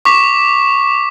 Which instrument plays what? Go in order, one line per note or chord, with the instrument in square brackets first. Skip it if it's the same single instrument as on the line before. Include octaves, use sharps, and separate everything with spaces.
[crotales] C#6 D6 B6